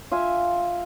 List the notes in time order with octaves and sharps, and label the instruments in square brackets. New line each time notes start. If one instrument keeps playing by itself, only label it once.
[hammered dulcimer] F4 E5 G#5